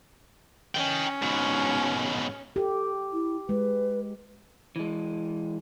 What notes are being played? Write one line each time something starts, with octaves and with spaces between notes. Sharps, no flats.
C#4 D#5 G5
G#2 B2
G4 A4
E4
G#3 B4
E3 G#3